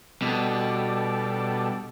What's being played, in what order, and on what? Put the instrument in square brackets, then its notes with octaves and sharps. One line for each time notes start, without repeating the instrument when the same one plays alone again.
[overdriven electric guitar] B2 [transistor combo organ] G3 D4 A4